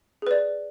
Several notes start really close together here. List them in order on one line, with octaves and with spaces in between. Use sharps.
G#4 B4 D5